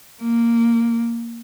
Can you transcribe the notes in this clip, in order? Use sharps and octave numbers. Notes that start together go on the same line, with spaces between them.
A#3